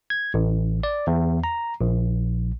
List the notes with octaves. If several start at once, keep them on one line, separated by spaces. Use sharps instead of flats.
G#6
A1
D5
E2
A#5
A#1